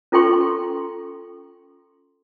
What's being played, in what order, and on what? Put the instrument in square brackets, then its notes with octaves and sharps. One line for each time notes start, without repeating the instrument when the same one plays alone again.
[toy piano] C#4 F4 A4 G5 C6 C#6